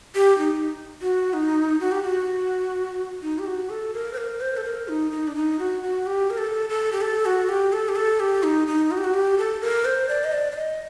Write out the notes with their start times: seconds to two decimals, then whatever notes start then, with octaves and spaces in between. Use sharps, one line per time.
0.15 G4
0.38 D#4
1.01 F#4
1.33 D#4
1.80 F#4
1.92 G4
2.03 F#4
3.22 D#4
3.38 G4
3.46 F#4
3.70 A4
3.94 A#4
4.13 C5
4.17 A#4
4.41 C5
4.57 A4
4.64 A#4
4.88 D#4
5.11 D#4
5.27 D4
5.35 D#4
5.59 F#4
5.82 F#4
6.06 G4
6.30 A#4
6.38 A4
6.69 A4
6.92 G4
7.01 A4
7.25 F#4
7.49 G4
7.72 A4
7.89 G4
7.96 A4
8.20 G4
8.43 D#4
8.67 D#4
8.91 F#4
8.97 G4
9.04 F#4
9.14 G4
9.38 A4
9.61 A#4
9.85 C5
10.08 D5
10.24 D#5
10.32 D5
10.52 D5
10.56 D#5